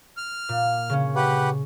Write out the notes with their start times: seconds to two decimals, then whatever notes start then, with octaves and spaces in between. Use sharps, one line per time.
0.17 F6
0.49 A#2
0.90 C#3 C#4
1.16 G4 B4 F#5